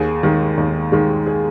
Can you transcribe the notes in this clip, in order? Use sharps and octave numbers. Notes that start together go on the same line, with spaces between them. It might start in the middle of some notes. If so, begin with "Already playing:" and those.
Already playing: D#2 G#4
D#3 G#3
D#2
D#3 G#3
G#4